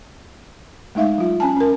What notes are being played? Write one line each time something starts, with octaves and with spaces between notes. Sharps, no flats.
G#3 A3 D#4 E5 F5
F#3 F4
C#4 G#5 A5
C#4 A#4